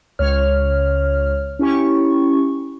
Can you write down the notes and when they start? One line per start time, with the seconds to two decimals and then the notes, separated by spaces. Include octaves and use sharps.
0.19 C#2 C#5 F6
1.59 C#4 E4 G4 C#6